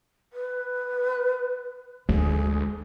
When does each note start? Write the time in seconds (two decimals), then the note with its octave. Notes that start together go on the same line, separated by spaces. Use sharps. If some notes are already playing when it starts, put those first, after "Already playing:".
0.33 B4
2.09 D2 G#3 G#4